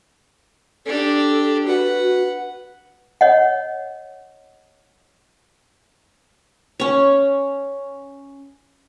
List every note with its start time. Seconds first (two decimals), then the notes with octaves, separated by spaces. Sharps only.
0.86 D4 G4 A4
1.67 F#4 B4 F#5
3.21 C#5 D#5 F#5
6.80 C#4 C#5